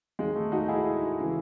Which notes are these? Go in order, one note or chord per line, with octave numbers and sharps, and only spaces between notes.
D#2 D#3 G#3
A3
D#4 F#4
E4 G#4
C#3 E3